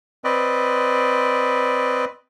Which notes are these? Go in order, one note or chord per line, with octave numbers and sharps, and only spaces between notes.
C4 B4 D5 D#5